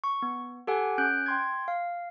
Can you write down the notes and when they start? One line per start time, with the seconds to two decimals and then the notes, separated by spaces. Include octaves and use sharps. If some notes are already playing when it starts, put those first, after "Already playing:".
0.04 C#6
0.22 B3
0.67 G4 A4 F#5 G#5
0.98 C#4 F#6 G6 D7
1.26 G5 C6 G#6
1.68 F5